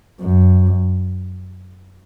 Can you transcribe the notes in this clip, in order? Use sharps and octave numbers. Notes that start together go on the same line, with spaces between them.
F#2